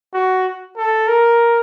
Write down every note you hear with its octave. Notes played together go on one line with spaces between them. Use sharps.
F#4
A4
A#4